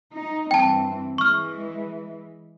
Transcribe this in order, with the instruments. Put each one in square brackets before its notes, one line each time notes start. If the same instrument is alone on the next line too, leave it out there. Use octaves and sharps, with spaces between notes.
[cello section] D#4
[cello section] G2 E3 C4 [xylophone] G5 A5
[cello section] E3 G#3 [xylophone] C#6 F6